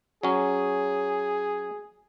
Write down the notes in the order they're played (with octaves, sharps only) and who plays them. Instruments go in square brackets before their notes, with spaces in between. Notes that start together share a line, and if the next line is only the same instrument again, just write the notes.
[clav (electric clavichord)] F#3 C#4 [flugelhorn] G#4